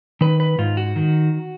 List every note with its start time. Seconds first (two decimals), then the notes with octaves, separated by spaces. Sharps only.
0.21 D#3 B4
0.40 B4
0.58 G#2 F4
0.77 F#4
0.96 D#3